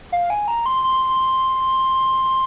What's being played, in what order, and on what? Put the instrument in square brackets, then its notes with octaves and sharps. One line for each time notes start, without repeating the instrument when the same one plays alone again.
[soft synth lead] F5
G#5
A#5
C6
C6